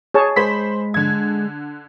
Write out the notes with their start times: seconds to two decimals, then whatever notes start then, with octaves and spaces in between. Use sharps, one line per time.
0.14 G#4 C#5 A5
0.36 G#3 C5 B5 B6
0.94 D3 G#6